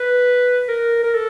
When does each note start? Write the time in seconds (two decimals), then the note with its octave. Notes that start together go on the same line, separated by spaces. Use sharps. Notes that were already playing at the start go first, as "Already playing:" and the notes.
Already playing: B4
0.68 A#4
1.04 A#4
1.14 A4